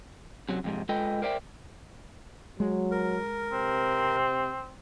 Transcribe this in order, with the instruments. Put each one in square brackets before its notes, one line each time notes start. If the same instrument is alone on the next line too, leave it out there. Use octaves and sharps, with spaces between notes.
[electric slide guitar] F#2 C3 F#3
F2 G#2 C3
G#3 F4 A4 B4 D#5 G5
A#4 C5 D5 E5 G5
[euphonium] F#3 [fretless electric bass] G#3
[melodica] A#4
[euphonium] C3 [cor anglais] C4